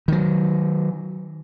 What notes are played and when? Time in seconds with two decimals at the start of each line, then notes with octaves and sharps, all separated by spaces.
0.08 D#3 F#3